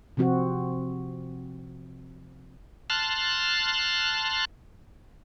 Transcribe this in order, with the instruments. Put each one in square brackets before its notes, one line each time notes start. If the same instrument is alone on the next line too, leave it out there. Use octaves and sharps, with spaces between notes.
[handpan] C3 F3 C4 F#4
[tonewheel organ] A5 C6 F6 F#6